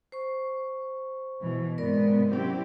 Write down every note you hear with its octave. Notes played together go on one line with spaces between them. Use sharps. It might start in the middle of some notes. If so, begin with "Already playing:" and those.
C5 C#6
B2 E3
G#2 C3 B3 A#4 D5
F#3 C4 C#4 E4 G4